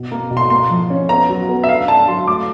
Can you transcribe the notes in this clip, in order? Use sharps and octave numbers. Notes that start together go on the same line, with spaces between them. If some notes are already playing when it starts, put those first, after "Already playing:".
Already playing: B2
A#3
B2
C6
A#3 C6
F3
C#4
B3 A#5
F#3
B3
E5
D4 F5
D4 A5
F#3 C6
A3 D6